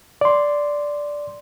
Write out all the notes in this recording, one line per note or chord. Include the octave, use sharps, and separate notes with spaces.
D5 C6